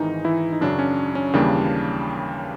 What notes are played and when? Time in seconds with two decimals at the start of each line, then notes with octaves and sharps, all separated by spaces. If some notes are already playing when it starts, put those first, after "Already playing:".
Already playing: G#1 G#2 D#3 E3 G#3 D#4
0.25 E3 E4
0.53 D#4
0.61 F#2 C#3 F#3 D4
0.79 C#4
1.15 C#4
1.33 D#2 C#3 E3 G3 A#3 D4